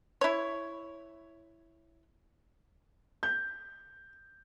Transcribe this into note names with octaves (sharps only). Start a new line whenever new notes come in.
E4 C#5
G6